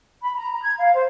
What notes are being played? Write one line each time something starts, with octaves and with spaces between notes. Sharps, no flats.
B5
A#5
A#5
G#6
F5
C5